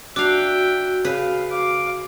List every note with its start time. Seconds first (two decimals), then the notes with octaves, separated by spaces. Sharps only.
0.16 D4 F#4 E5 F5 G5
1.04 C#3 B4 F5
1.50 F5 D6